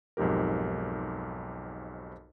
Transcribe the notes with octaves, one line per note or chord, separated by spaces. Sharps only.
B1 F2 G#2 G4 A#4